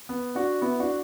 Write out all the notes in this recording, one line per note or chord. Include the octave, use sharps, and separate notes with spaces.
B3
D4 F#4
B3 E4
D4 F#4